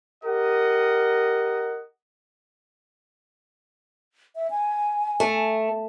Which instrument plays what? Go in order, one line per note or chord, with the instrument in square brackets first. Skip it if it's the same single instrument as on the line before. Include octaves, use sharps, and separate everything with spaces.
[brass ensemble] G4 A#4 D#5 F#5
[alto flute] E5
G#5
[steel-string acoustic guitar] A3